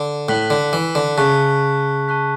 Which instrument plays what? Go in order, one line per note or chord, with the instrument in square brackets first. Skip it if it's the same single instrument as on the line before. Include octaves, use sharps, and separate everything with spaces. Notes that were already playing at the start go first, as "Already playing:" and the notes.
Already playing: [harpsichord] D3
[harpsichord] A2 [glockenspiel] F#6 B6 F#7
[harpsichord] D3
E3
D3
[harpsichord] C#3 [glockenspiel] A5 C#6 F#6 B6
[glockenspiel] A5 C#6 F#6 B6